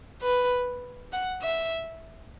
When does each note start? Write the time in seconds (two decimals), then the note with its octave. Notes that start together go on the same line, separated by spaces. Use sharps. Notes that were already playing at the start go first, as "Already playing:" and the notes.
0.22 B4
1.12 F#5
1.42 E5